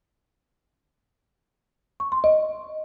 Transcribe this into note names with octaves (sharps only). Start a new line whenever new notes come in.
C#6
C6
D#5